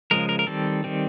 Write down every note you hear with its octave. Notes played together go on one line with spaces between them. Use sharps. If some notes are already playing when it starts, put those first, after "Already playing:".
C#3 F3 G#3 A#4
A#4
A#4
D#3 G3 C4 A4
D#3 G3 C4